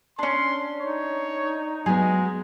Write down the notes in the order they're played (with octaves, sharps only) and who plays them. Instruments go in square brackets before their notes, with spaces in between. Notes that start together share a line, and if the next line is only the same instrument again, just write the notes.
[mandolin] C#4 D4 [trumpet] C6
[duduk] D#4 [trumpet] C#5
[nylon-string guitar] F#3 B3 [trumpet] G#3 [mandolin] G#4